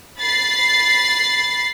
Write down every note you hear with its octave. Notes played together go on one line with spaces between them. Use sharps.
B5 A6 C7